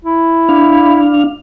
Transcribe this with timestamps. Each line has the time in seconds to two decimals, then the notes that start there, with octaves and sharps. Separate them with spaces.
0.05 E4
0.49 D4 F5